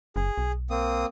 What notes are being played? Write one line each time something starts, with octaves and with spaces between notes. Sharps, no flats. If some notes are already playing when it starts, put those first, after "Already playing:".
F#1 G#4
B1
A#3 C4 D#6